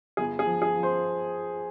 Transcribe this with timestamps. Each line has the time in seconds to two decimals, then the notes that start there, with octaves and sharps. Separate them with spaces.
0.17 G1 G#4
0.39 G#4
0.46 F3
0.62 G#4
0.75 F3
0.83 C5